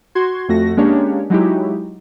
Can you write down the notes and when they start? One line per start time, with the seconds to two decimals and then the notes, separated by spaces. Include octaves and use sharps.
0.15 F#4 C6 G#6
0.48 F2 A3 F#4 A#6
0.77 G#3 A#3 C#4 D4 G4 C#5
1.30 F#3 G#3 D#4 E4 F#4 G4